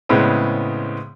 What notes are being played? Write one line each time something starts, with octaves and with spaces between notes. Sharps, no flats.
A2 C#3 G#3 B3 C4